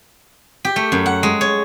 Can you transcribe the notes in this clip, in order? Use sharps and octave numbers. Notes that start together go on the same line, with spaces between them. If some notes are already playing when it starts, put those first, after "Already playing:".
G4
A3
F#2
F#5
G#3
C#5